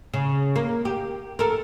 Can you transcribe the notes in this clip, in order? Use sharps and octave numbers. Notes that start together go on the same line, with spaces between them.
C#3
A#3
G4
A4 A#4